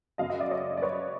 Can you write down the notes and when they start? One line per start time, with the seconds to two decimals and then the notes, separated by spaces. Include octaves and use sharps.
0.18 F#2 C#3 F#3 D#5 F5
0.30 D#5 F5
0.40 D5 E5
0.51 C#5 D#5
0.77 D5
0.82 B4 C#5